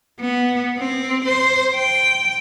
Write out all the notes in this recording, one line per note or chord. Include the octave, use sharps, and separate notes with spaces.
B3
C4
C5
G5